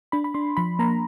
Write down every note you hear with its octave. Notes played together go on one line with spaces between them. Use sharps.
D4 B5
B5
D4 C6
F3 B5
A#3 A#5